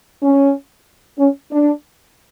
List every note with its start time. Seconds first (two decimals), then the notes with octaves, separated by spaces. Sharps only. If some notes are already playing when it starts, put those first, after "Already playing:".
0.22 C#4
1.18 C#4
1.51 D4